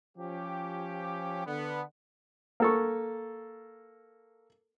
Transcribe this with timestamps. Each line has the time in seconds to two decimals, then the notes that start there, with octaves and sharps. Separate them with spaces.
0.18 F3 C#4 G4
1.46 D3 B3
2.60 A#3 A4 C#6